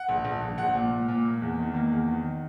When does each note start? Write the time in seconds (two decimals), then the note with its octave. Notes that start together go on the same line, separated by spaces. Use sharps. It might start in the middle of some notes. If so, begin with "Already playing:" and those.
Already playing: F#5
0.09 A#1
0.25 A#1
0.42 A#1
0.58 A#1 F#5
0.75 A#2
0.92 A#2
1.08 A#2
1.25 A#3
1.42 E2
1.59 D#3
1.74 A#3
1.91 E2
2.08 D#3